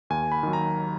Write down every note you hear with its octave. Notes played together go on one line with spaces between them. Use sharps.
D#2 G#5
B5
D#3 F#3
A#5